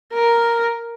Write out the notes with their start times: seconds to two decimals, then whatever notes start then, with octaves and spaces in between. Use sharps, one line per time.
0.13 A#4